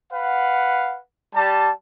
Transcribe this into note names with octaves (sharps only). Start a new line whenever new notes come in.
B4 F5 F#5
G3 A5